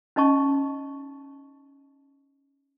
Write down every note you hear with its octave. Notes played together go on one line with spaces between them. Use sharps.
C#4 D#4 D#5 A5 C#6